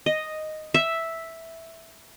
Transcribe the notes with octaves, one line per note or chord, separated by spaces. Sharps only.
D#5
E5